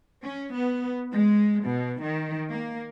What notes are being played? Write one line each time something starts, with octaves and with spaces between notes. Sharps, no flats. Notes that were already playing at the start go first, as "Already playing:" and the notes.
C#4
B3
G#3
B2
D#3
A#3